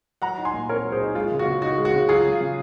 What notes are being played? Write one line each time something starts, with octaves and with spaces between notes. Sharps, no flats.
F#3 F#5 A#5
D#4
G#5 C6
A#2
C4 A#4 C#5
F#3
G#4 C5
D#4
G#3 F4
C#3
F#4
C#3
D#4 F#4
G#3
F#4
C#3
F#3 F4 G#4
C#3
C#3